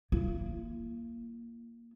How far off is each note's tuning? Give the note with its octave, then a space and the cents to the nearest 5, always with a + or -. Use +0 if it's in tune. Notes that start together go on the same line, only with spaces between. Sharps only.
A#3 +0 F4 -40